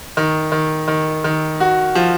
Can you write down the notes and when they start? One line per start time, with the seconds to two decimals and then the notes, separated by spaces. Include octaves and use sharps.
0.17 D#3
0.52 D#3
0.88 D#3
1.24 D#3
1.60 F#4
1.95 F3